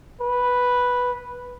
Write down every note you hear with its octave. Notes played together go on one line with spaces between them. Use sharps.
B4